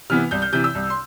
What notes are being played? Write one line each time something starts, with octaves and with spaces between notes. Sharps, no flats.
C3 E3 B3 F6
C2 G6
G6
C3 E3 G6
E6
C2
C6